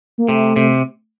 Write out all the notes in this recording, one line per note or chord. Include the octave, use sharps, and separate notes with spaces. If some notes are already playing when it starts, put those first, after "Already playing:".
A#3
C3 A3
C3